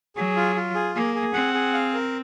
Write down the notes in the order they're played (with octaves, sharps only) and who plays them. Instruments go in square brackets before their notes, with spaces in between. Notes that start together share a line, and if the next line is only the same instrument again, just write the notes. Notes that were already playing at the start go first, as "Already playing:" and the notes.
[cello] F#3 [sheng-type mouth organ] G#4
[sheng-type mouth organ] F4
F4
G#4
[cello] A#3 [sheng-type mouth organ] G#4
[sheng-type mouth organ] G#4
[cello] C4 [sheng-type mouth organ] F#5
[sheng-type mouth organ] G#4
F5
A#4